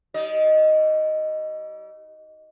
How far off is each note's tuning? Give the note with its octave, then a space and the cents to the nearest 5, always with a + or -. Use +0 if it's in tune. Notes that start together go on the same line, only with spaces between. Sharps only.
G3 -40 D#4 +30 D#5 +0